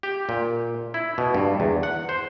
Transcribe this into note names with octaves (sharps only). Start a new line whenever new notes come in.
G4
A#2
E4
B2
G2
E2
F#5
C5